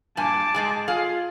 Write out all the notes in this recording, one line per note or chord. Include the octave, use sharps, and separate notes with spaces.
G2 A#2 G#5 A5 D6
G#2 G#3 G#4
F4 G#4 F5